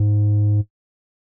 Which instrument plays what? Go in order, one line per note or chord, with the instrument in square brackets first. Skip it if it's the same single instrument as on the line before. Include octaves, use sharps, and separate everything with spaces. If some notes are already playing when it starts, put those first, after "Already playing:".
Already playing: [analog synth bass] G#2